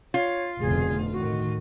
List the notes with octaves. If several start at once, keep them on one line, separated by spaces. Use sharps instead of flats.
F4 C#5
F1 D2 B2 G#4
A2 D#3 F#4